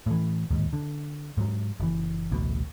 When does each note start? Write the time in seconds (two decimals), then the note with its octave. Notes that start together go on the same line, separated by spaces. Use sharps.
0.06 A2 E3
0.51 D1 D#2 G#2
0.73 D3
1.37 G#2 F#3
1.80 F#1 E3
2.31 A1 D2 B2